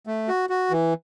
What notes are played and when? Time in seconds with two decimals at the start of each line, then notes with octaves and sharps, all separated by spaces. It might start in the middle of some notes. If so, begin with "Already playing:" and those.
0.07 A3
0.28 F#4
0.50 F#4
0.71 E3